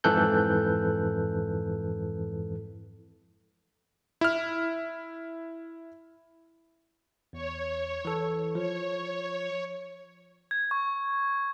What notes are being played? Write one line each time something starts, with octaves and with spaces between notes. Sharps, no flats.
F2 G#2 E3 A4 F#6 G6
E4 F6
E2 C#5
E3 A4
F3 C#5
G#6
C#6